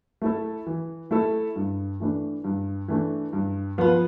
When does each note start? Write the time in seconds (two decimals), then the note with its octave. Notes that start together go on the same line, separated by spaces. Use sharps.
0.22 A3 E4 A4
0.66 E3
1.11 A3 E4 A4
1.56 G2
2.00 E3 A3 D4
2.44 G2
2.88 E3 A3 D4
3.33 G2
3.78 F3 B3 F4 B4